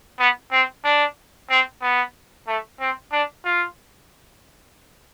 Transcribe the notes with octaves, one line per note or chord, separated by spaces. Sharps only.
B3
C4
D4
C4
B3
A3
C4
D4
F4